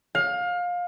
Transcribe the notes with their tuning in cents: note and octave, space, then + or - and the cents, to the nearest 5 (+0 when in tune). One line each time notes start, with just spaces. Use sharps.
F5 +25